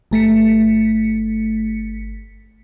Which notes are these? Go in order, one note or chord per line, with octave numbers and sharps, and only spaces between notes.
G1 A3 B6 C#7